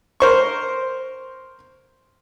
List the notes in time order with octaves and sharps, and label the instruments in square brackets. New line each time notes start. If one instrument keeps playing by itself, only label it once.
[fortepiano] A#4 C5 C#6